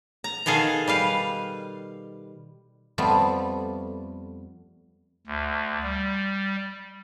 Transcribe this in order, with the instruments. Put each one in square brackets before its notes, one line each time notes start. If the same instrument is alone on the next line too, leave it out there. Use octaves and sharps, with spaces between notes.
[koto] A#5
B2 D#3 G#4 A4 F5
G3 B4 F5
[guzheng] F2 G3 A3 B3 F4
[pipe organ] D2
G3